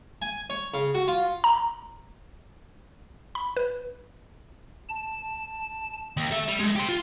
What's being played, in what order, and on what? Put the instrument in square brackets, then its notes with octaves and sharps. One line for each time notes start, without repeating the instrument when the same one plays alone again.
[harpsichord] G#5
C#5
C#3
F#4
F4
[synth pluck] A#5
B5
B4
[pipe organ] A5
[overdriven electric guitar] D#2
A4 E5
G3
G#3 A3
G4 C6
F4